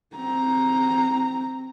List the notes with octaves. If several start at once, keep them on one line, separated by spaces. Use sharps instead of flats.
C4 A#5